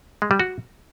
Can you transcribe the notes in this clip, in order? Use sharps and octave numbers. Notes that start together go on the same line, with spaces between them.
G#3
G3
F#4